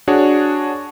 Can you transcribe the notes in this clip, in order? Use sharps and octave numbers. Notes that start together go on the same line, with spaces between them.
D4 F#4 G#4 C#5